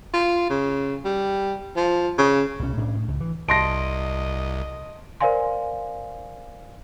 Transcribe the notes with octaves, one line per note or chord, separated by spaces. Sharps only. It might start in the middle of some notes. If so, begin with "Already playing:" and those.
F4
C#3
G3
F3
C#3
C2 B2 D#3 C#4
A2 C#4 D4
A2
C#2
E3
C2 D#5 A5 C6 A#6 D7
A#4 C5 D5 F5 G#5 C6